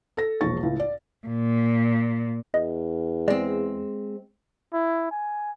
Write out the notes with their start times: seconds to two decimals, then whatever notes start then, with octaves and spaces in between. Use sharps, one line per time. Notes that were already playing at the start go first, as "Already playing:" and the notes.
0.17 A4 A#6
0.41 E1 A#1 C#6 A6
0.63 C#2 A2
0.80 D5
1.27 A#2
2.54 E2 D#5
3.28 G#3 C4 D5
4.73 E4
5.11 G#5